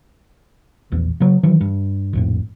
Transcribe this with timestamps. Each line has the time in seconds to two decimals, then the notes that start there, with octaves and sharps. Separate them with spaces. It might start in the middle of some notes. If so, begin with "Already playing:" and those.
0.92 A#1 E2
1.20 C#3 F#3
1.43 D#3 E3 F#3
1.61 G2
2.13 A#1 F2 A2